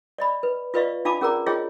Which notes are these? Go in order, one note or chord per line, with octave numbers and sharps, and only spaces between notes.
D5 D#5 B5
B4
F4 B4 D5 D#5 F5 C#6
D4 F4 F5 A5 B5 D6
C#4 G#4 A#4 D5 A#5 D6
F4 G#4 C#5 D#5 G5